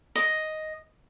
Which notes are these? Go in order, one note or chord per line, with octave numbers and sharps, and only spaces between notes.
D#5